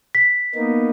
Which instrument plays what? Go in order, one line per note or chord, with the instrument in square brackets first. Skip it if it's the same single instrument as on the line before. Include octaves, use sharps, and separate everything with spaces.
[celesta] B6
[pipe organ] A#3 B3 D#4